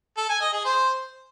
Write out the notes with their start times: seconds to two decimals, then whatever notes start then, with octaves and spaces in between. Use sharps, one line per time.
0.17 A4
0.29 G#5
0.41 D#5
0.53 G#4
0.65 C5